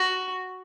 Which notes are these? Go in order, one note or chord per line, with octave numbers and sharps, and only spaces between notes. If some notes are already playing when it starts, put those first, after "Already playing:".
Already playing: F#4